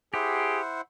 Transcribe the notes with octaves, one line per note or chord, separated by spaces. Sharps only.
E4 G4 G#4 C5 F#5